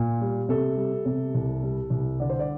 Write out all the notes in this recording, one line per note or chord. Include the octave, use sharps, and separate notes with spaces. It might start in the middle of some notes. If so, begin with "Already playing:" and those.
Already playing: A#2
G3
C3 A4
G3
C3
C2
G3
C2
D3 D5
C5
D5